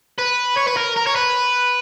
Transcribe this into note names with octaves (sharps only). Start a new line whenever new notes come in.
B4
C#5
B4
A#4
A#4
C#5
B4